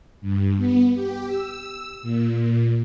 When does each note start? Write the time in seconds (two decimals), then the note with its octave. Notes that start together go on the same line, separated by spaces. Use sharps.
0.21 G2
0.57 B3
0.94 G4
1.27 E6
2.02 A#2